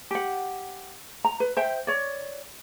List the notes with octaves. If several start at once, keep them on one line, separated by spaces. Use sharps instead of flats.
G4 F#5
A#5
B4
C5 E5 G5
C#5 D5